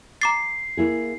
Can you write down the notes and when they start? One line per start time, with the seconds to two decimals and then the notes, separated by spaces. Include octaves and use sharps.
0.21 A#5 D6 A6 C7
0.77 A#3 E4 G#4